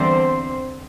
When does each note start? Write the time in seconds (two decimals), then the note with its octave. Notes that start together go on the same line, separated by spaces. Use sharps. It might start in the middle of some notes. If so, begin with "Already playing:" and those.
Already playing: E2 D3 G3 C4 C5